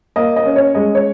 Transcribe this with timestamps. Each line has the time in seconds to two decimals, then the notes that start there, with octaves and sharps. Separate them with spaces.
0.16 A#3 D#5
0.36 D#5
0.46 C#4
0.56 C#5
0.75 G#3 D#5
0.95 C#5